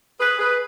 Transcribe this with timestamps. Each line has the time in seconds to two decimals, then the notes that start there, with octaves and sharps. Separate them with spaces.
0.19 G#4 B4
0.39 G#4 B4